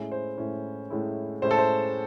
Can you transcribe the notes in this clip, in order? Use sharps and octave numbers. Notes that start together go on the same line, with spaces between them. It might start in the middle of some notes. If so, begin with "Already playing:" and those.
Already playing: A2 G#3 C#4 E4
C5
A2 G#3 C#4 E4
A2 G#3 C#4 E4
A2 G#3 C#4 E4 C5
A4
C5